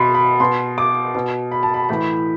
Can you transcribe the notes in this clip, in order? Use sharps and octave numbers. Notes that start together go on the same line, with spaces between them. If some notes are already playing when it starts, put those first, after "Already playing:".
Already playing: B2 B5 C6
B5
B2 C6
D6
B2
B5
A5
B5
A2 E3 B5